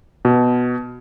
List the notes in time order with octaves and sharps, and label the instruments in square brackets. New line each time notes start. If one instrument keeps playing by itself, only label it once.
[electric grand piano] B2